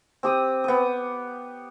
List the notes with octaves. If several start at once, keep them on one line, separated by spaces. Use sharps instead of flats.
C4 G4 D#6
B3 D#6